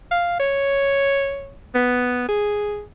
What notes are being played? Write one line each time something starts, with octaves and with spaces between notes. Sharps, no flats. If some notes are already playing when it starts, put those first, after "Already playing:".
F5
C#5
B3
G#4